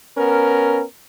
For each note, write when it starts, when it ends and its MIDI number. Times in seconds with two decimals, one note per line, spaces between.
0.17 0.83 59
0.17 0.83 61
0.17 0.83 70